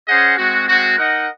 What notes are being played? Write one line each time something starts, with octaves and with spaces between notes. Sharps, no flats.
C#4 G#4 C5 D#5 F#5
G#3 C4 F#4
G#3 C4 F#4
D#4 A#4 D#5 F#5